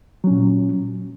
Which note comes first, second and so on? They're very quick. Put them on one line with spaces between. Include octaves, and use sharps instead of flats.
F#3 C#4 A#2